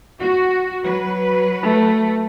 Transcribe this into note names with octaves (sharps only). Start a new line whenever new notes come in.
F#4
F#3 B4
A3